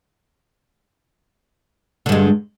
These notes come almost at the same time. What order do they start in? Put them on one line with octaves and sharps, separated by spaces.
D3 G2 G#3